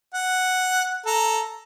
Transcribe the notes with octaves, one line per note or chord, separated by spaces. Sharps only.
F#5
A4 A#5